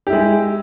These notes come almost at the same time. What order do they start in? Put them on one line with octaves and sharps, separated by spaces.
G4 E4 G#3